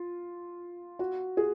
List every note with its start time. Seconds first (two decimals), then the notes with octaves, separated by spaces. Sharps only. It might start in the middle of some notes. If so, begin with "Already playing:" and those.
Already playing: F4
0.99 F#4
1.37 G#4